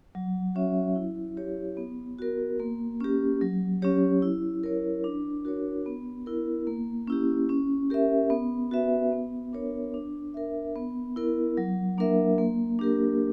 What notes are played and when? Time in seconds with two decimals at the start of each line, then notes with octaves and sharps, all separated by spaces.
0.15 F#3
0.55 C#4 F#4 C#5 E5
0.96 E4
1.37 G4 C#5
1.77 B3
2.18 F#4 A#4
2.60 A#3
3.00 C#4 G4
3.41 F#3
3.82 C#4 G4 C#5
4.22 E4
4.64 A#4 C#5
5.04 D4
5.45 F#4 A#4 C#5
5.86 B3
6.26 E4 A#4
6.67 A#3
7.07 C#4 E4 G4
7.49 C#4
7.90 G4 A#4 E5
8.30 B3
8.71 F#4 B4 E5
9.12 B3
9.53 D4 A#4 C#5
9.94 D4
10.34 A#4 E5
10.76 B3
11.16 E4 A#4
11.57 F#3
11.98 A#3 D4 A#4 E5
12.38 A#3
12.79 D4 G4 A#4